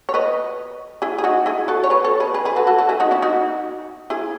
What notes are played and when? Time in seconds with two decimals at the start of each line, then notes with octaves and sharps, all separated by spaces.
0.09 C#5
0.14 B4 D#5
1.02 E4 G#4
1.18 G#4
1.24 D#4 F#4
1.46 E4 G#4
1.68 F#4 A4
1.84 C#5
1.90 G#4 B4
2.04 A4 C#5
2.20 G#4 B4
2.34 G#4 B4
2.45 G#4 B4
2.56 F#4 A4
2.67 F#4 A4
2.79 F#4 A4
2.89 E4 G#4
3.00 D#4 F#4
3.11 C#4 E4
3.22 D#4 F#4
4.10 E4 G#4